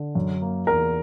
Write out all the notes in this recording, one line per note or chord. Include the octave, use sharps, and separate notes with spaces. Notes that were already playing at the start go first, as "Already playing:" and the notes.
Already playing: D3
F#2
A#3
E2 A#4